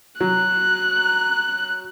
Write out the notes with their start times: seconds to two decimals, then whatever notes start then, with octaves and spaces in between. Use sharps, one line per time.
0.20 F#3 F#6